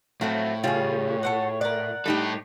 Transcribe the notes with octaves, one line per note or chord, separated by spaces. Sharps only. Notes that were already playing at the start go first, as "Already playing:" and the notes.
A2 F3 F#3 A3 C4
C#3 G3 F4 G#4 C#5
A4 C5 F#5
A#4 D5 F#5
A2 G3 D#4 G4 A4